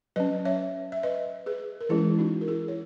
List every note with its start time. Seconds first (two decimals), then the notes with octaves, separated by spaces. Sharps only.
0.16 F#3 C#4 B4 D#5
0.45 C#5 E5
0.92 E5
1.03 B4 D#5
1.46 G#4 B4
1.81 A#4
1.89 E3 G#3 C#4 E4 G#4
2.19 D#4 F#4
2.41 A#4
2.48 E4 G#4
2.68 C#5